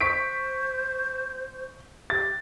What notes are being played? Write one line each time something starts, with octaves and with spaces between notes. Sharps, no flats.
C5 C#6 B6 D7
G4 A6